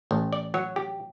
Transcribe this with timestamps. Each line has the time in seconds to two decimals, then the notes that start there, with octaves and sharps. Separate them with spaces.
0.11 A1
0.33 D5
0.54 F#3 C#5
0.76 G4